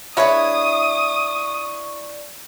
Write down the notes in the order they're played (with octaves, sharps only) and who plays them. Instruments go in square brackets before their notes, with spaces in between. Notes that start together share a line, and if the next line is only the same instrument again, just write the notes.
[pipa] G#3 B4 C#5 [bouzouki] D4 E4 [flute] C#6 [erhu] D#6